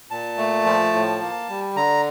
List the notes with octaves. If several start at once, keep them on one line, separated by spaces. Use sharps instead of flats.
A#2 A5
A3
F3
A2
A#3
G3
D3 A#5